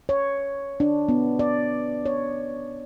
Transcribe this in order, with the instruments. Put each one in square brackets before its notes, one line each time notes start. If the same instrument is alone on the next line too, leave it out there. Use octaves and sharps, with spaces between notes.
[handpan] C#5
D4
B3
D5
C#5